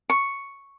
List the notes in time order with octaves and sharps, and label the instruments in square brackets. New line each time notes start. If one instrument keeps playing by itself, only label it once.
[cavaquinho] C#6